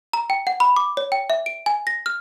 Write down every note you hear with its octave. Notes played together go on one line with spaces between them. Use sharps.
A#5
G5
F#5
B5
D6
C#5
G5
E5
D7
G#5
A#6
F6